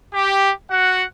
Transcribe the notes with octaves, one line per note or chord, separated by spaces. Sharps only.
G4
F#4 F#5